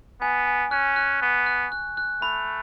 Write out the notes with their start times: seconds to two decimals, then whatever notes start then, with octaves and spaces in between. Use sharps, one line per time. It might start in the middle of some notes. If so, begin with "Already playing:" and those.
0.21 B3 G#5
0.47 G#5
0.71 C#4 F#6
0.96 F#6
1.22 B3 C#6
1.46 F#6
1.72 F#6
1.97 F#6
2.22 A3 B5